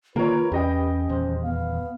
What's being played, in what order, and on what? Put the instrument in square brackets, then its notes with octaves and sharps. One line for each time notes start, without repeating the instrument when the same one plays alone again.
[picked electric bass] D3 D#3 A#3 [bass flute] F4 [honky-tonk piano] A#4 C#5 [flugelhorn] B4
[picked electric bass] E2 [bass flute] C#4 [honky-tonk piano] G4 D#5 G5
[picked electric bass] D#1 E2 [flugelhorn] C5
[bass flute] B3 [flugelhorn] F5